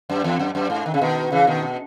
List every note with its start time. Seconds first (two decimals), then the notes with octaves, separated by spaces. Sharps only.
0.10 F#2
0.24 E2
0.39 F#2
0.55 F#2
0.70 G#2
0.86 D#3
0.94 C#3
1.02 B2 D#3
1.32 C#3 E3
1.47 B2 D#3
1.63 B2